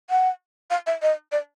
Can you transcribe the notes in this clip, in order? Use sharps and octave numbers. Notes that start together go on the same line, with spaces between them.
F#5
F5
E5
D#5
D5